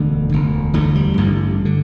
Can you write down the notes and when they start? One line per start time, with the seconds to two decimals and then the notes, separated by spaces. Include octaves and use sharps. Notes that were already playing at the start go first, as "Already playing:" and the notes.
Already playing: E1 D2 D3 A3
0.29 E1 D2 D3
0.74 E1 D2 D3 A3
0.95 G3
1.17 A1 G2 D3
1.65 D3